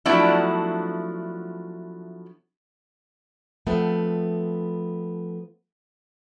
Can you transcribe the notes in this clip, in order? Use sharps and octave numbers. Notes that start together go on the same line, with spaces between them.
F3 F#3 A3 B3 D4 E4
F3 A3 B3 C4